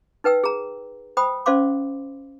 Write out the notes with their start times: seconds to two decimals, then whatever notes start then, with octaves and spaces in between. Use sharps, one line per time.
0.24 D#4 B4 G5 E6
0.44 G#4 A#5
1.17 C5 G5 B5 D#6
1.46 C#4 C5 D5 F5 C6 D6